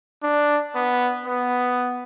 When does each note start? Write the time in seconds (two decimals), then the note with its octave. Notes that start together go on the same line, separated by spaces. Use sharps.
0.23 D4
0.75 B3
1.26 B3